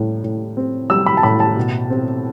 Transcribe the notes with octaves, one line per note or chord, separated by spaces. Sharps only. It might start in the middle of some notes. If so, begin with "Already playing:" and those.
Already playing: A2 G3
A2
C4
G3 E6
B5
A5
A2 B5
A5
B2
C4